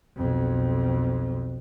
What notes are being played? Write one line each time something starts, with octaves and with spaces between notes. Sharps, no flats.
B1 F2